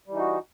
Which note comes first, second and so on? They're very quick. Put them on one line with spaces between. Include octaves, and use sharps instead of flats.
G3 E3 D#4 F#4